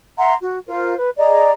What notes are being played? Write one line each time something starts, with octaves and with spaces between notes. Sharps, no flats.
E5 F#5 A#5 C6
F#4
F4 A#4 C5
B4
G#4 D5 D#5 A#5